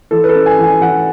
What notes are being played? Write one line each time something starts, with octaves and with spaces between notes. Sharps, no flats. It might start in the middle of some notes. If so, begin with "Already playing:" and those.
E3 A4
B4
A4
C#4
G#5
E3 G#5
E3 F#5